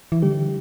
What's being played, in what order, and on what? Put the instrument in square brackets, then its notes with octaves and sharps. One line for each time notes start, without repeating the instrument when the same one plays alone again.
[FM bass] E3
[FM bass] D3 [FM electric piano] G3 G4